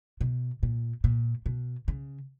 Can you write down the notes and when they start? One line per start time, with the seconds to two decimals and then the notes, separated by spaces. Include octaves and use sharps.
0.21 B2
0.63 A#2
1.04 A#2
1.46 B2
1.88 C#3